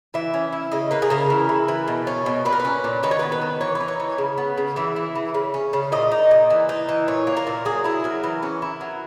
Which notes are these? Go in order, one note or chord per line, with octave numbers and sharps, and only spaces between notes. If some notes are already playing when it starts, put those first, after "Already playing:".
E3 E5
C#4
E4
C#3 D#5
A#3 B4
G#4
C#3 A#4
E3
E4
E3
B2
C#4
B2
A#2 B4
A#4
B4
C#4
A#2
D#3 B4
C#5
B3 B4
B4
D#3
E3 C#5
B4
D#4
C#5
E3
C#3
B3
C#3
E3 E5
E4
E3
C#3
C#4
C#3
A#2 D#5
D#4
A#2
E3
D#4
E3
A#2 C#5
A#3
A#4
A#2
F#3 G#4
E4 G#4
F#3 A#4
E3
C#4
E4
F#3